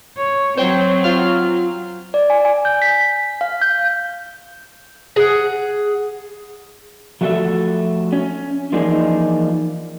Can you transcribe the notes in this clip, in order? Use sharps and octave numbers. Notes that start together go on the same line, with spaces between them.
C#5
F#3 C4 C5 C#5 G5
F4 F6
D5
G#5
G#5
G6
B6
B6
F5
G6
G#4 F#5
F3 A3 F#4 G4 A4 E5
C#4
E3 F3 A#3 D4 D#4 G#4